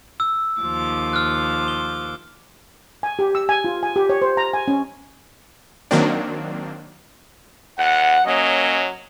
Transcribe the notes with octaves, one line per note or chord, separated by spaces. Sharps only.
E6
D#2 F3 D6
F6 F#6
G7
G#5
G4
E6
G#5
F4
G#5
G4
C#5
C5
A#5
G#5
C#4
D#3 F#3 A#3 C4 D4
D#2 F#5
F#3 A#3 C#4 D#5